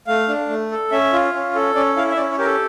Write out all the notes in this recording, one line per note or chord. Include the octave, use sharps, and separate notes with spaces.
A3 F5
D4
A3
A4
C#4 E5
F4
C#4
A4
C#4 D5
E4 F5
E5
C#4 D5
C#5
G4 A#4
A4